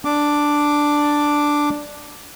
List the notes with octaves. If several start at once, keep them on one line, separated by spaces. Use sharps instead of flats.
D4 D6